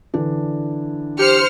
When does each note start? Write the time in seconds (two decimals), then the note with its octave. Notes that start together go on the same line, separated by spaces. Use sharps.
0.14 D3 E3 D4
1.19 G4 C5 F6 C#7